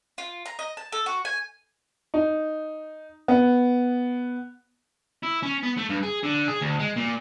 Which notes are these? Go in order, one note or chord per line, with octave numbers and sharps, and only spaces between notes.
F4
A#5
D#5
A5
A4
F#4
G#5
D#4
B3
E4
C#4
B3
A3
G2
G#4
D3
G#4
D2
G#3
A#2